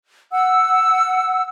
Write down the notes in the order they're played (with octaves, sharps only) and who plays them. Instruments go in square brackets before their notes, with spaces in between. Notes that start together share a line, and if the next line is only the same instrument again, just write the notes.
[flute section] F#5 E6